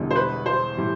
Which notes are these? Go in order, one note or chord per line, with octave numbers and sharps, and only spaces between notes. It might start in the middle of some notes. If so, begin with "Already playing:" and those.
Already playing: E1 E2 D3 G3
C5
B4
C5
A2 E3 G3